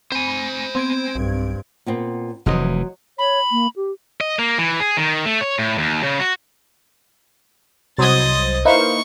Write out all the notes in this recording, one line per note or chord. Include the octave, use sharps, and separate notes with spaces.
C4 C5 G#5 B5
B3 C4 G#6 D7
B1 G2
A#2 B3 C4
F1 G#2 E3 F#3 C5 D#5
C#5 B5
A#3
G4
D#5
A#3
E3
G#4
D#3
A3
C#5
A2
D#2
C#3
F#4
C2 F#3 C5 D#5 D#6 G#6 A6
A#3 D#4 E4 B4 C5 F5 C#6